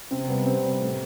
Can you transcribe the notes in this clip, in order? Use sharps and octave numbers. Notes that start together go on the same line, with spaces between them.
C3 C4
G3 B3
C3 C4
G3
A2